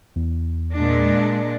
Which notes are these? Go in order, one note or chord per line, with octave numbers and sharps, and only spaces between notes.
E2
A#2 G#3 D4